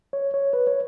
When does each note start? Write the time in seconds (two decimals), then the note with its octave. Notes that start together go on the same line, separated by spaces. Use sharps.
0.13 C#5
0.34 C#5
0.53 B4
0.67 C#5